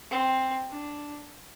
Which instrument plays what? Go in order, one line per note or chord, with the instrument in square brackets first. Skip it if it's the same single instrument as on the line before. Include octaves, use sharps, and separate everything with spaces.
[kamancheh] C4
D4